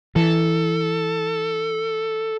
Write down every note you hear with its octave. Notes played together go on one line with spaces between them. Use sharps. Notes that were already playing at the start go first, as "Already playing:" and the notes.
E3 A4